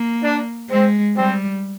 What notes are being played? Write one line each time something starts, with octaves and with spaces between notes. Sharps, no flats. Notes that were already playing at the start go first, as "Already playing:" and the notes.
Already playing: A#3
D4
G#3 C4
G3 C4